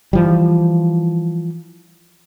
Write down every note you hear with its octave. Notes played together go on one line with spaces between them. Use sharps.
E3 F3 G3